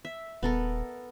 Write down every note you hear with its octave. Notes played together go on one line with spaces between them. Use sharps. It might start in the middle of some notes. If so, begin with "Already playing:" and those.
E5
D#1 B3 A4 A#4